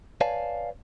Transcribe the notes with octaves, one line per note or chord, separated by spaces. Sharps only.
B4 C#5 D5 F5 G#5 A5